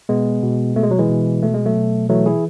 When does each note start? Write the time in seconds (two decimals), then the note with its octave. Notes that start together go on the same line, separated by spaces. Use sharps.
0.09 B2 G#3 B3
0.43 B2
0.76 B2 A3
0.83 G#3
0.91 F#3
0.99 E3 G#3
1.09 B2
1.43 B2 A3
1.54 G#3
1.66 F#3 A3
1.76 B2
2.09 E3 F#3 A3
2.26 E4 G#4